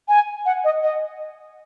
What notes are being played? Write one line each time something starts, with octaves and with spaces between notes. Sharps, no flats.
G#5
F#5
D#5
D#5